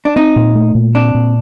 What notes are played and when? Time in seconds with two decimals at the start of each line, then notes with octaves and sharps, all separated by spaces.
0.05 D4
0.16 C4 D#4
0.36 A#2
0.55 A3
0.75 A#2
0.94 C4 D4
1.14 A#2